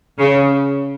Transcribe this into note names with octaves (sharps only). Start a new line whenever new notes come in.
C#3